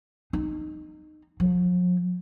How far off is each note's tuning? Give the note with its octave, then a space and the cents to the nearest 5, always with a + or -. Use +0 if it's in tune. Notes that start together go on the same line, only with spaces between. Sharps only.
D#4 -20
F3 +45